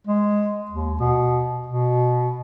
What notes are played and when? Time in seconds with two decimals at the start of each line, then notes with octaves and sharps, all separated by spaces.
0.07 G#3
0.71 D#2
1.00 B2
1.66 B2